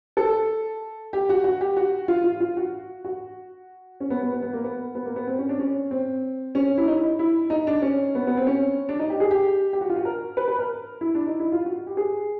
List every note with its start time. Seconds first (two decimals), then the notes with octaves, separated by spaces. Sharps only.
0.17 A4
1.13 G4
1.29 F#4
1.44 F#4
1.61 G4
1.77 F#4
2.08 F4
2.24 F4
2.40 F4
2.57 F#4
3.05 F#4
4.00 C#4
4.10 B3
4.22 B3
4.32 B3
4.42 B3
4.53 A#3
4.64 B3
4.95 B3
5.06 A#3
5.16 B3
5.27 C4
5.39 C#4
5.49 D4
5.59 C#4
5.91 C4
6.55 C#4
6.78 E4
6.87 D#4
6.97 E4
7.19 E4
7.50 D#4
7.67 D4
7.82 C#4
8.15 B3
8.27 B3
8.37 C4
8.47 C#4
8.89 D4
8.99 D#4
9.10 G4
9.20 G#4
9.31 G4
9.73 G4
9.81 F#4
9.90 F4
9.96 F#4
10.05 A#4
10.37 B4
10.48 B4
10.59 A#4
11.01 E4
11.15 D4
11.27 D#4
11.40 E4
11.52 F4
11.65 F#4
11.87 G4
11.97 G#4